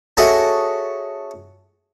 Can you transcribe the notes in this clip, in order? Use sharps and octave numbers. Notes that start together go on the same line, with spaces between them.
C#4 F#4 G#4 A4 D#5 E5